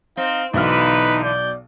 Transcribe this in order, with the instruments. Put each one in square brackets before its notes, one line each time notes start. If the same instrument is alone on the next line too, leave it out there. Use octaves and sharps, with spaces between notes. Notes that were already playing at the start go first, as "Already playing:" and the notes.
[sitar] C4 [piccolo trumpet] D#4 [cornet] F5
[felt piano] B1 B2 F6 [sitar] D3 E3 [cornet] D#4 [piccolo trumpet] B4
[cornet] D5 [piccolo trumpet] G6